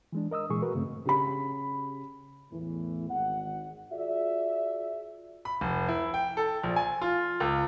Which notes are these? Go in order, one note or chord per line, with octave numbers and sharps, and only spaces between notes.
E3 G#3 D4
A#4 D#5 D#6 E6
A#2 E3 G#3 G#4 C#6
F#4 A#4 B4
G2 C#3 A3 C4
C#3 G4 B5
E2 A2 E3
G#1 F#5
F4 F#4 G#4 D5 E5
B5
F1
E4
G5
A4
A#1
G#5
F4
C#2